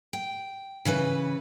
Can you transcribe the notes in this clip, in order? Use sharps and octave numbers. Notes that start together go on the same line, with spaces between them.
G5
C#3 E3 C#4 B4